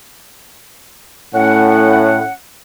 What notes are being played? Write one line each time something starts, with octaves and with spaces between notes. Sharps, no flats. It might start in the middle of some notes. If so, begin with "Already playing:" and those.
A2 C#4 F#5